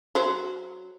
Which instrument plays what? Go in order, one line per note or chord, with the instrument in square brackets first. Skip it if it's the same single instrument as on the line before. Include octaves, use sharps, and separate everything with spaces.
[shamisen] F#3 C5